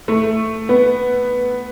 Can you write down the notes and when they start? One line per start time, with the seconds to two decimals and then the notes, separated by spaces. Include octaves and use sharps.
0.08 A3
0.69 B3